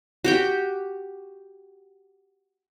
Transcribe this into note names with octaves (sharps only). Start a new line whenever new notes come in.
F#4 G4 G5